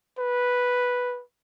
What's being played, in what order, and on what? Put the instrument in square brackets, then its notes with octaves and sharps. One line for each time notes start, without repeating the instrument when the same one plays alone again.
[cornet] B4